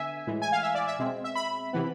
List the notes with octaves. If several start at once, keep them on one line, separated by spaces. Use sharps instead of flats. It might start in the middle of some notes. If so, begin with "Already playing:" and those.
Already playing: D3 B3 E5 G#5
A2 E3 G#3
G#5
F5
E5
D5
E5
B2 G#3 C4
E5
B5
C3 E3 B3